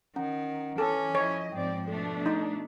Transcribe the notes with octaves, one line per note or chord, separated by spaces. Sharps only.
D#3 C#4 F#5 A#5
E3 C#4 A4 G#5 D6 F6
F3 E4 C#5 D#5
G#2 F3 C4 D5 G5
B2 A3 D4 A4
D#4